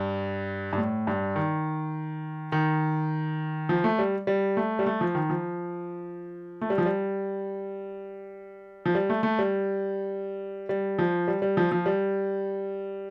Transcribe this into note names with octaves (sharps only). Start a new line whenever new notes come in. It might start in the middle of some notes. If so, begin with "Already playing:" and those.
Already playing: G2
G2
A2
G2
D#3
D#3
F3
A3
G3
G3
A3
G3
A3
F3
D#3
F3
A3
G3
F3
G3
F3
G3
A3
A3
G3
G3
F3
G3
G3
F3
F3
G3